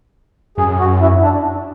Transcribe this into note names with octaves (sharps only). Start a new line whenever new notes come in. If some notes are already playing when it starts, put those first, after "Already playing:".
F#2 G#4
F#4
E4
D4